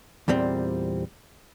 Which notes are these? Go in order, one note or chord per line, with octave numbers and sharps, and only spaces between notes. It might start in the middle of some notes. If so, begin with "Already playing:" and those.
E2 A#2 G3 C4